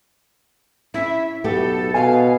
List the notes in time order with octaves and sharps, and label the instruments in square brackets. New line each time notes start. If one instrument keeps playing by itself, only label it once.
[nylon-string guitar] C#4 E4 [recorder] E5
[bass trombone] B1 [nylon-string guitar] A3 B3 G4 [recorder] A4
[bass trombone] B2 [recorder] F5 [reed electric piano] G#5